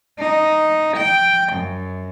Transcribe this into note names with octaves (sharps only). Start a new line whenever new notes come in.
D#4
G5
F#2